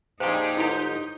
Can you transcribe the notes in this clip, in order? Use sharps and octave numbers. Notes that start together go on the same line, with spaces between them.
F2 A#2 D#4 G4 G#4 C5
G1 G#2 E4 G4 G6